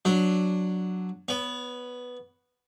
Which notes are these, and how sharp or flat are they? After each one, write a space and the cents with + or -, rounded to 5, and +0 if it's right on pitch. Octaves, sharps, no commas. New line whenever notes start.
F#3 -5 D4 +0
B3 +0 C#5 +35